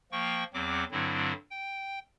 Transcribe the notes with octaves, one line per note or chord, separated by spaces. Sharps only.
F3 A#3 G5 C#6
E2 F#3 C4 D6
G2 D3 F#3 C4 E4
G5